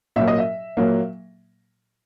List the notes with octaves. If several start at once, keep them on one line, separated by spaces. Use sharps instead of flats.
A#2 F#3 A#3 E5
D#5
E5
A#2 F#3 A#3